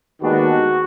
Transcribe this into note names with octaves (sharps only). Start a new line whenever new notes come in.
D#2 D#3 G#3 B3 D4 F#4